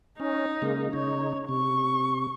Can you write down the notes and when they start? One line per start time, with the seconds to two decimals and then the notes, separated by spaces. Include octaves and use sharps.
0.20 C#4 D#4
0.62 C#3 G#3 A#3
0.93 C#3 D#4 C#5
1.49 C3 C#6